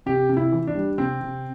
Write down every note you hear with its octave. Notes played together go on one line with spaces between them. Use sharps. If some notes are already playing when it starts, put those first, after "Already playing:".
C3 G4
C3
E4
E3
D4
G3
C3 C4
C3